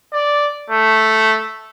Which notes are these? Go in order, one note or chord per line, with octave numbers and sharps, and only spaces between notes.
D5
A3